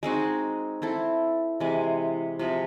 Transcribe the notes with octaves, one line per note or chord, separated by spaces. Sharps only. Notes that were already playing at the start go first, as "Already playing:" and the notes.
G#3 C4 D#4 F#4
C4 E4 A4
C3 E3 G#3
C3 F3 G#3